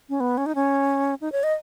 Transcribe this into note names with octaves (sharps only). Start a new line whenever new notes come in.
C#4
B3
C#4
D#4
C#4
D#4
C#5
D#5